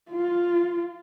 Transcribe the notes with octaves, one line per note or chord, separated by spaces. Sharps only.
F4